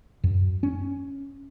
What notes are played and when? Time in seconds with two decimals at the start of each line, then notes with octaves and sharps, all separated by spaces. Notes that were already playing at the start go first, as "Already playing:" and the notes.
0.24 F#2
0.63 C#4